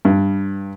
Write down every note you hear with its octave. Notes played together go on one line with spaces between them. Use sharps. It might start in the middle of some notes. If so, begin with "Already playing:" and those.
G2